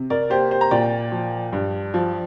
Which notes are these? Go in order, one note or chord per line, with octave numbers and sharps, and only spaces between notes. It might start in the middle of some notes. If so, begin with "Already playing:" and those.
Already playing: C3
A#4 D5
A#3 G4 C5
G4 C5
A#5
A#2 D5 G5
F3
G2
F3